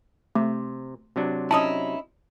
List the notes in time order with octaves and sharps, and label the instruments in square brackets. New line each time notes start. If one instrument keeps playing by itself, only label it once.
[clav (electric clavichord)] C3 [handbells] A3
[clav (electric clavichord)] C3 F#3 D4
[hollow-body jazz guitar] C#4 D#4 E4 [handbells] A5 D#6